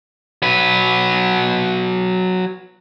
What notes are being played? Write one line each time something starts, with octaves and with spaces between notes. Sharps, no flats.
F#3 B4